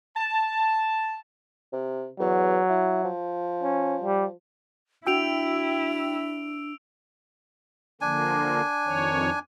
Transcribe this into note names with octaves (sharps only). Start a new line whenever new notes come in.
A5
C3
E2 F#3
E4
F3
C#4
G3
D4 E4 F#4 G5 E6 D7 F7
D3 F3 A#3 D4 G#5
F2 D#3 C#5